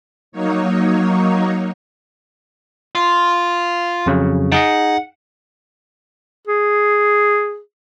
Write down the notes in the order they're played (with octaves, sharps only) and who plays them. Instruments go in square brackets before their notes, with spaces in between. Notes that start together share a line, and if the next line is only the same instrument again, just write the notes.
[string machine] F#3 A#3 D#4 C#5
[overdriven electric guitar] F4
[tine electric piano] F2 C#3 F#3
[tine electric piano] D#4 G#4 D#5 [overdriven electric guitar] F#5
[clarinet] G#4